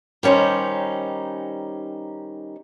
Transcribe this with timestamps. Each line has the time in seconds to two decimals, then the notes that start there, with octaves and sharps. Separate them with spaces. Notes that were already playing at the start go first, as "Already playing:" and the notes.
0.23 D#3 G3 C#4 D#4 C5